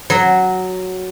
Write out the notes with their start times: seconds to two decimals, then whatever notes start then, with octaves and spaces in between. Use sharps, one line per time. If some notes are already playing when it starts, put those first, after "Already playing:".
0.10 F#3